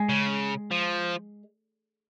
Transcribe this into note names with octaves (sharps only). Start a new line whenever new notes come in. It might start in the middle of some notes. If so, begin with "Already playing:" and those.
Already playing: G#3
C#3
F3